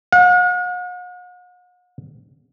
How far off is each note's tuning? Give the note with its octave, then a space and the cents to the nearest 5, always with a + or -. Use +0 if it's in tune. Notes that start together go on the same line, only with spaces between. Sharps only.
F#5 -45